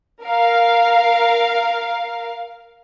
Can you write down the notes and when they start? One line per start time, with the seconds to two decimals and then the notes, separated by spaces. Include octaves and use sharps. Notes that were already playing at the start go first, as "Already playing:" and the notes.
0.23 A#4 F5